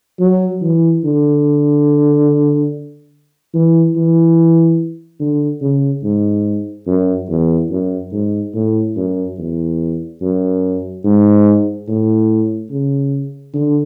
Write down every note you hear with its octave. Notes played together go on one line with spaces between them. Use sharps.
F#3
E3
D3
E3
E3
D3
C#3
G#2
F#2
E2
F#2
G#2
A2
F#2
E2
F#2
G#2
A2
C#3
D3